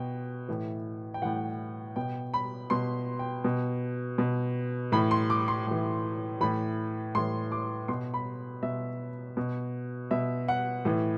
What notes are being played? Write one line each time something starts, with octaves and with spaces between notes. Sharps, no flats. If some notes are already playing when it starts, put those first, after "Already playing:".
Already playing: B2 G5
A2 E3
G5
A2 E3 F#5
B2 G5
B5
B2 C6
G5
B2
B2
A2 E3 B5
C6
D6
C6
A2 E3
A2 E3 B5
A2 E3 C6
D6
B2 C6
B5
B2 E5
B2
B2 E5
F#5
A2 E3